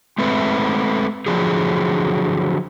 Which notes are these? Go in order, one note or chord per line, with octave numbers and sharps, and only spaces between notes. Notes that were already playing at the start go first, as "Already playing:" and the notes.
G#3 A3 C4 B4 E5
D3 F3 F#3 G#4